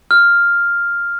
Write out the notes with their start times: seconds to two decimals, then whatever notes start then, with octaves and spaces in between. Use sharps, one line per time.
0.11 F6